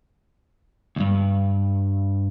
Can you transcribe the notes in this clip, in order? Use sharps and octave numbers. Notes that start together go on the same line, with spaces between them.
D2 G2